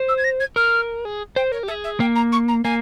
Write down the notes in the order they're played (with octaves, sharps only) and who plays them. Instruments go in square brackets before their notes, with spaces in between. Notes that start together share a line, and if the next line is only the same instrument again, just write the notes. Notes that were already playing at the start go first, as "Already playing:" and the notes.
Already playing: [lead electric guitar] C5
[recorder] E6
G#6
A#6
G#6
[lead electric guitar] A#4 [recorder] F6
[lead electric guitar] G#4
[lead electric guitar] C5 [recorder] G5
[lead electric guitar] A#4 [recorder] C#5
[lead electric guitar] G4
[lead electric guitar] G#4 [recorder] E5
[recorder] E5
[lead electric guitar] A#3 [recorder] G5
[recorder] A#5
C#6
A#5
[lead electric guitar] A#3 [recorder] G#5